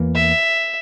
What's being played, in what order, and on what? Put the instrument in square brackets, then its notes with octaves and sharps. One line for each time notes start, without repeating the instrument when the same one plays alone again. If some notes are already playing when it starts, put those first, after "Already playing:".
Already playing: [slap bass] E2 E3 A#3
[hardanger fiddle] E5